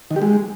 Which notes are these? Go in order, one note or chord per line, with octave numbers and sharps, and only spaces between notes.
D#3
G4
G#3